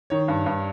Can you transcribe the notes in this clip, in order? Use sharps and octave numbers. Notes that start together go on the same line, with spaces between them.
D#3 C#5
G2
G2